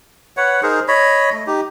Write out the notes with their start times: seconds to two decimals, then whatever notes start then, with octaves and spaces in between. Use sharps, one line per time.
0.37 B4 C#5 F#5
0.63 D#4 G#4 A#4 C5
0.88 C#5 D#5 B5
1.32 A3 D#5
1.47 D#4 G4